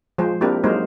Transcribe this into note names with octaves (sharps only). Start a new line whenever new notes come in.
F3 G#3 C5
A#3 C4 D4 E4 G4 A#4
F#3 G#3 A#3 D#4 A#4 C5